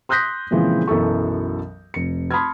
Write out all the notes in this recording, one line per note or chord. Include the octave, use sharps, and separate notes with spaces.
C6 D#6 F#6 G6 A#6 B6
A#2 C#3 E3 F3 G#3 C4
B1 F#2 E3 A4 C#6
F1 C#7
A5 B5 C6 D#6 F6 G#6